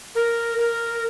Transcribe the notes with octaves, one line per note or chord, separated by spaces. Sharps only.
A#4
A#4